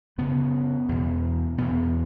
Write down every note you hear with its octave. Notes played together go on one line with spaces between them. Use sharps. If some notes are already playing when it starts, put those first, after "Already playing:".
F#2 C#3 B3
E2 B2
E2 B2 B3